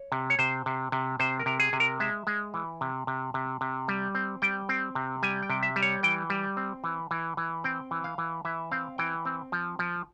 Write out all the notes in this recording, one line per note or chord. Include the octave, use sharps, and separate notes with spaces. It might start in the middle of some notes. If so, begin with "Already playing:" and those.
Already playing: C#5
C3
C#5
C3 C5
C3
C3
C3 C5
A#4
C3
G#4
C3
A#4
G#3 E5
G#3
E3
C3
C3
C3
C3
G3
C4
G3 G5
C4
C3
G3 G#5
G5
C3
E5
G3
C#5
E3 G5
G3
C4
E3
E3
E3
C4 G5
E3
F5
E3
E3 E5
C4 F5
E3 G5
C4
F3
F3